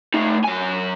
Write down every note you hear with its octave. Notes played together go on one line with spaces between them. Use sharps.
A3 D#4
F#3 G#5